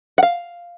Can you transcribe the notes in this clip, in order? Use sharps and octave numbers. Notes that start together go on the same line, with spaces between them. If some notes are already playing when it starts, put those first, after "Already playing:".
F#5
F5